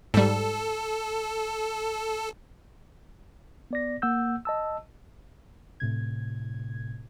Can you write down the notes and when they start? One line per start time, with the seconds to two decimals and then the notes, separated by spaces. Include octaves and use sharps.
0.14 G#2 G3 A4
3.71 B3 D5 A#6
4.02 A#3 F#5 E6 G6
4.45 D#5 A5 E6
5.80 A2 C3 G#6